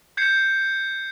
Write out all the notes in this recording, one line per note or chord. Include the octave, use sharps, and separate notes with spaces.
G6 G#6 C7 C#7